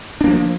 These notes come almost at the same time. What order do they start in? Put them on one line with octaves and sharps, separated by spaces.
D4 A#3 F3